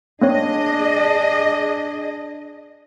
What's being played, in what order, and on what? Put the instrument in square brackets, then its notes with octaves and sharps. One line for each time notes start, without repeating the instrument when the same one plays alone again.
[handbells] A#3 C4 C#5 [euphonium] D4 [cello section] G#4 D#5